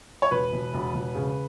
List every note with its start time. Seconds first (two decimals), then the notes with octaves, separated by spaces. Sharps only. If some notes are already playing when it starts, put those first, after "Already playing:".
0.22 C#5
0.31 E1 B4
0.52 E1
0.74 E1
0.94 E1
1.15 C#3